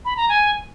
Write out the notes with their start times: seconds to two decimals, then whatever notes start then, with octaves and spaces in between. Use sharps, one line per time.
0.05 B5
0.17 A#5
0.29 G#5